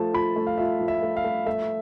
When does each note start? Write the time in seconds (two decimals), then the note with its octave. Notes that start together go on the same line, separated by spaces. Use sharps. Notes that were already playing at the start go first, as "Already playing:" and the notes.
Already playing: F3 A3 A5
0.13 F4 B5
0.36 A3
0.47 F5
0.58 F4 E5
0.80 F3
0.88 E5
1.02 A3
1.17 F5
1.24 A3
1.46 A3 E5